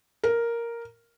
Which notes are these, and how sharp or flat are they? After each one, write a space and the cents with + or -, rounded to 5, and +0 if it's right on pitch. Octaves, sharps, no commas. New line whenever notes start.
A#4 +0